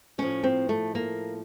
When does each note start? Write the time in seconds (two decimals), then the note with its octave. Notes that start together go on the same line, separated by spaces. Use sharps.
0.18 A2 F3 C#4
0.43 C4
0.69 A3
0.95 A#3